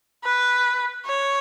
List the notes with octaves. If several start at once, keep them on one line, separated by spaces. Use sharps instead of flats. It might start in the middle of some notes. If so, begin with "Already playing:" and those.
B4
C#5